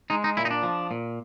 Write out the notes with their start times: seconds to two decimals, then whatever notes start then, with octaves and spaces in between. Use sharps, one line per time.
0.10 G#3 D#4
0.24 D#4
0.37 A#2 E4
0.45 D#4
0.51 D4
0.63 F3
0.91 A#2